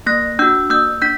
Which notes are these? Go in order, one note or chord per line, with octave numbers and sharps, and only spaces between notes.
A#3 F#6 A#6
D4 F#4 E6 G6
A#3 E6 G6
D4 G6 B6